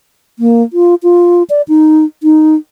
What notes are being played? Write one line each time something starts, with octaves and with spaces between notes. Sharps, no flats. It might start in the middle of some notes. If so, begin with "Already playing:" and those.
A#3
F4
F4
D5
D#4
D#4